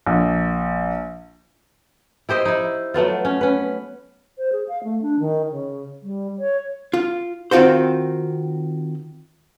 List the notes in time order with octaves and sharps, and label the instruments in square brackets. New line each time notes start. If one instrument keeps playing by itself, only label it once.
[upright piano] A#1
[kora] E4 G4 C5 D#5
D#4 E4
F#3 A3 B3 F4
C#4
C#4 B4
[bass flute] C5
G#4
F5
A3
D4
D#3
C#3
G3
C#5
[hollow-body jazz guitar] F4
D#3 C4 F4 F#4 C5